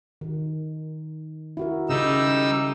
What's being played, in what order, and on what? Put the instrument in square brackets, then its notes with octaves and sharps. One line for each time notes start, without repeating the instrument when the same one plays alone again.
[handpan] D#3
E4 F#4 A#4
[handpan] C#3 [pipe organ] G3 D#4 E6